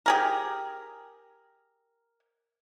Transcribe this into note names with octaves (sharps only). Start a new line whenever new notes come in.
G4 G#4 A#4